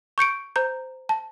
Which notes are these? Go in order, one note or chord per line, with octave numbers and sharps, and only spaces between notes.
C#6 G6 C#7 D7
C5 A#5 G6
A5